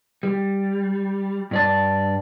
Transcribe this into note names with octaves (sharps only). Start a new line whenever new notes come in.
G3
G2 D5 A5